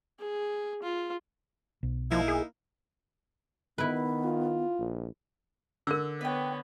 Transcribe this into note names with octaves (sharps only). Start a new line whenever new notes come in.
G#4
F4
B1
F3 A#3 D#4 E4
G#4
D#3 B3 E4 B4
F4
A#1
D3 A#4 E6
B3 B4 C#5 D#5 G5